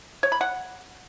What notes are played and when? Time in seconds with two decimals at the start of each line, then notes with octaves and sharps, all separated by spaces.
0.23 C#5
0.32 B5
0.41 F#5